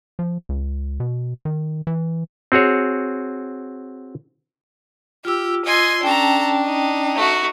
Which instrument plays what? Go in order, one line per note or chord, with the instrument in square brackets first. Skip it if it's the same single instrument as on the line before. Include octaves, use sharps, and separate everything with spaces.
[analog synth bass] F3
C#2
B2
D#3
E3
[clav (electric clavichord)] C4 F#4 G#4 C#5
[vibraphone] F4 E6 [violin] G4
[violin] D#5 C6 [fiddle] G#5
[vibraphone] C#4 G5 [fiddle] D4 [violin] A4 A#5
[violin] D#4
[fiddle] A3 F#4